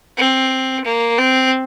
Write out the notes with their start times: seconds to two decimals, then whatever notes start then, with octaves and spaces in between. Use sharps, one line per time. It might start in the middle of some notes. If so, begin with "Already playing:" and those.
0.17 C4
0.85 A#3
1.18 C4